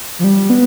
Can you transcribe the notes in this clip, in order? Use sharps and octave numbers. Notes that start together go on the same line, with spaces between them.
F3
G3
B3